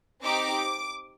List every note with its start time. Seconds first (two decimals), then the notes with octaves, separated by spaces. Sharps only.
0.23 C4 D#4 G4 D6